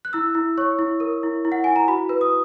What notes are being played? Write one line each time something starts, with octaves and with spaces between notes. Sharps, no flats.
F#6
E4 E6
E4
C#5 C#6
E4
A#4
E4
E4
F#5
E4 G#5
A#5
F#4 B5
B4
D#6